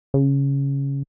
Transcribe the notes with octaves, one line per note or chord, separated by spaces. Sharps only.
C#3